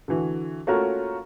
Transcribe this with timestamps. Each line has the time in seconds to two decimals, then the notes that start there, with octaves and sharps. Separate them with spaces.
0.08 D3 E3 F#4
0.67 A3 A#3 C#4 F4 F#4 A#4